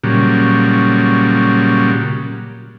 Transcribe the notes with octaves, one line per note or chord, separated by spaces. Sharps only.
A#2 C#3 F#3 G3